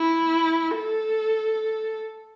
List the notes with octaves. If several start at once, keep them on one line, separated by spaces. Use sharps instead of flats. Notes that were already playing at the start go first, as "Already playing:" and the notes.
Already playing: E4
A4